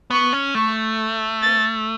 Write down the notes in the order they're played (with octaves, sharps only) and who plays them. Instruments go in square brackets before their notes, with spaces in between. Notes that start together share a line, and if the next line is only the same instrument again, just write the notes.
[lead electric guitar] B3 [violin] C#6
[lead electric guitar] C#4
[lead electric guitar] A3 [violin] C#6
[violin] A6